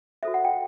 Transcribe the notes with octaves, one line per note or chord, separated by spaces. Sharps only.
F#4 A4 C5 E5
F#5
G5